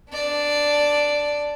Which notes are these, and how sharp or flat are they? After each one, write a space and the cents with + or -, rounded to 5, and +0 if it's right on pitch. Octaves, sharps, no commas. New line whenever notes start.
D4 +0 D5 +0